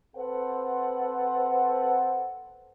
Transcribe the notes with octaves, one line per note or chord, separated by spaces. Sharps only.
C4 A4 B4 C5 F#5